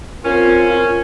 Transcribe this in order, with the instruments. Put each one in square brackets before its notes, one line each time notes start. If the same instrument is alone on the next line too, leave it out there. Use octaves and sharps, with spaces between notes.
[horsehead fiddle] C4 F4 [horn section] C#4 [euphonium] A#4